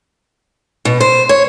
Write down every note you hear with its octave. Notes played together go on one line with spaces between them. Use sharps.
B2
C5
C#5